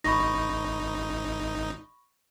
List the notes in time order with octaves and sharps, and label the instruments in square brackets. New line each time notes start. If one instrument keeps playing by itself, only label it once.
[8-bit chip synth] G#1 D#4 [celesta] B5 C#6 A#6